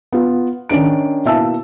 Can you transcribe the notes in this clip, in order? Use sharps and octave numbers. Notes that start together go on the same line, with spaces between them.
B3 F4
D#3 C#4 D4 D7
B2 A#3 E4 E5 A5 E6